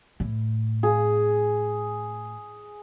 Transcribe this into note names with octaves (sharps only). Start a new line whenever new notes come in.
A2
G#4